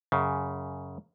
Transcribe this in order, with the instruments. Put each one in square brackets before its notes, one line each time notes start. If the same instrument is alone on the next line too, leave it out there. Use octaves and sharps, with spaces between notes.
[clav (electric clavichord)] F#2 C#3